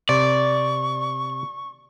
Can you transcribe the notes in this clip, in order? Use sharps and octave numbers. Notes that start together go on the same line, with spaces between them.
C3 D5 C#6